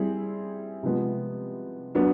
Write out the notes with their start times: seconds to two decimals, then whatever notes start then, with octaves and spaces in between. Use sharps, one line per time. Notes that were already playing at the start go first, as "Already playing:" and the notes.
Already playing: G3 C4 E4 G#4
0.83 C3 F3 G#3 B3
1.95 F#3 B3 D4